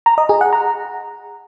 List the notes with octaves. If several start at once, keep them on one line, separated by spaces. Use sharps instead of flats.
A#5
D#5
G#4
F#5
A#5